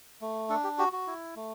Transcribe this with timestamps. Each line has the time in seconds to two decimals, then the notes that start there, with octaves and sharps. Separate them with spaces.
0.21 A3
0.49 D4 A4
0.64 G4
0.78 F#4 G4
0.93 F#4
1.07 E4
1.36 A3